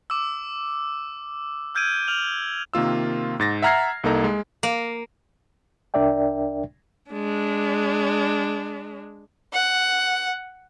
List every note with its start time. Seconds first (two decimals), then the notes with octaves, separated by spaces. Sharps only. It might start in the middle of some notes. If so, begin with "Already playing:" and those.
0.10 D6 E6
1.75 E6 F6 G6 G#6 D7 D#7
2.08 F6 F7 F#7
2.74 C3 D#3 A#3 F4 E6
3.40 G#2 A6 A#6
3.62 E5 F#5 A#5 F6 G#6 C7
4.04 C2 A#3 D#4 A4 A#5
4.24 G#3
4.63 A#3
5.94 C2 D4 A#4 D5 E5 G5
7.11 G#3 D4
9.53 F#5